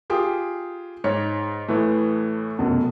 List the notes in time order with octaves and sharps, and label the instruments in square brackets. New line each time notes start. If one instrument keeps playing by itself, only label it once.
[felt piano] F4 G4 G#4
[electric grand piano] G#2 [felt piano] C#5
[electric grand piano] A2 E3 A3
[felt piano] F1 F#2 B2